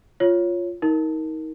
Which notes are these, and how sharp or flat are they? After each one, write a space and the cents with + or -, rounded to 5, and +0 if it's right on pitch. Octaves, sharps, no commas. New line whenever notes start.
F4 +0 C#5 +0
D#4 +30 A#4 +0